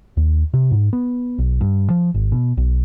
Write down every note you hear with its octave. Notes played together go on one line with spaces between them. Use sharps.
D#2
C3
G#2
B3
B1
G2
F3
G#1
B2
B1